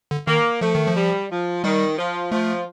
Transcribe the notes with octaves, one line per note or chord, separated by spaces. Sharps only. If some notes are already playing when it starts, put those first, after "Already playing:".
D3
D#3 A#3
F3 A3
D#3
F3
G3
F3
D#3 G3
F3
F3 A3